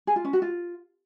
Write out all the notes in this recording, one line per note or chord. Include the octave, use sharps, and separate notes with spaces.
G#4
F4
C#4
F#4
F4